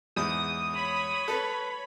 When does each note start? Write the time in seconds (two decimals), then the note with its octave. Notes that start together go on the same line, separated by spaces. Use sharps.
0.16 E2 G#2 D#6
0.71 C#5 B5
1.28 A4 B4